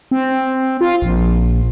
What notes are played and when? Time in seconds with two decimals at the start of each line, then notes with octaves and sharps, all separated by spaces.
0.11 C4
0.81 F4
1.02 A#1